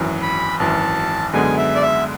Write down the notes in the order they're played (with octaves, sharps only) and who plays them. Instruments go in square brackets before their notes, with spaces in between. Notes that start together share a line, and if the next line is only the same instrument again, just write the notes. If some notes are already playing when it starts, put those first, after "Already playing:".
Already playing: [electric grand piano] G#1 F#2 E3
[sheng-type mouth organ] B5
[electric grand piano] G#1 F#2 E3 [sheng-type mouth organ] A5
[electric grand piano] F#2 D3 G#3 B3 [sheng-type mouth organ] G#5
[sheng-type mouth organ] E5
D5
E5